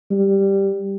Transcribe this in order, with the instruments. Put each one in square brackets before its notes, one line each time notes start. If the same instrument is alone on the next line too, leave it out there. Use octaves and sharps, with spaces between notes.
[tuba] G3